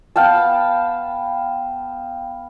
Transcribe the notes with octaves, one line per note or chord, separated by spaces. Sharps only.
B3 F5 G5 A5